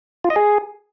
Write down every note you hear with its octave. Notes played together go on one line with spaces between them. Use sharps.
F4
D#5
G#4